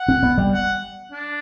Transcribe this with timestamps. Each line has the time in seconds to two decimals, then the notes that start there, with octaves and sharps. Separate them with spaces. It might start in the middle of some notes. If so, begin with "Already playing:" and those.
Already playing: F#5
0.08 C4
0.23 B3
0.38 G3
0.53 F#5
1.12 D4